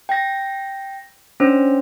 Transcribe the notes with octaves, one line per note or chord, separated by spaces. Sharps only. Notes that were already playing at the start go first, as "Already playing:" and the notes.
G5 A#6
C#4 D4 C5